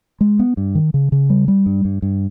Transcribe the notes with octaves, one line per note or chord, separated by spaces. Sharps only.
G#3
B3
G2
D#3
C#3
C#3
G3
G3
G2
G2
G2